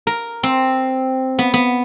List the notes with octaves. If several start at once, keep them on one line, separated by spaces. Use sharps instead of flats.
A#4
C4
B3
B3